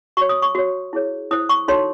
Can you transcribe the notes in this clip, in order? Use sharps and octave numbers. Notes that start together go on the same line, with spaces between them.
F#4 C#5 C#6
D#6
C#6
F#4 C#5
E4 G#4 C#5
E4 C5 D#6
C#6
D#4 F#4 A4 C#5 C6